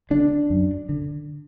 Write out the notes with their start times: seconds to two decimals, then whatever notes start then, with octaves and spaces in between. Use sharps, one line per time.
0.10 D3 D4
0.50 F#2
0.89 D3